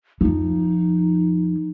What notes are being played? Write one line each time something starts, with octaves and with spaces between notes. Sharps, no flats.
F2 F3 D#4